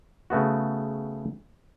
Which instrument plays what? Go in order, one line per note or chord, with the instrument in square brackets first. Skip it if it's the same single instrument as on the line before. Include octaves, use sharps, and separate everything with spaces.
[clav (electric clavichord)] C#3 A3 B3 F#4